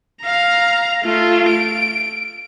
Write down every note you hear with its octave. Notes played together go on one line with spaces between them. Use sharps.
F5 A#5
A3 F4
D7